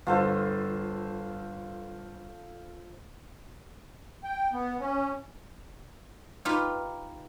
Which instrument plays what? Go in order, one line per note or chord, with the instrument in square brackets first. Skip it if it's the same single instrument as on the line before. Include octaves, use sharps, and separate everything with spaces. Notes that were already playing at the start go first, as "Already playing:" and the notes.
[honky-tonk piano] G1 [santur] F4 A4 C5
[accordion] G5
B3
C#4
[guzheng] D#4 F4 G4 B4